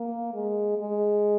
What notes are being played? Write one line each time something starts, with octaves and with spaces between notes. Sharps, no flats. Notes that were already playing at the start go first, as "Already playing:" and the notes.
Already playing: A#3
G#3
G#3